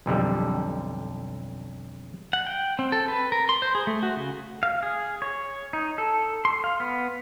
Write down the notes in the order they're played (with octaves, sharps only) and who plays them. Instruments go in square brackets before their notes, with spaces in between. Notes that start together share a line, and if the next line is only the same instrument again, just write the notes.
[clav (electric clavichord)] B1 F2 D3 G3
[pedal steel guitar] F#5
G5
C4
A4
B4
A#4
C6
C5
G#4
A3
F#4
C#3
F5
G#4
C#5
D#4
A4
C6
F5
B3